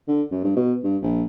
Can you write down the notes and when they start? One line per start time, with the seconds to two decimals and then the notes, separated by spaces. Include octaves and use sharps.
0.08 D3
0.31 F#2
0.44 G2
0.56 B2
0.84 G2
1.02 A#1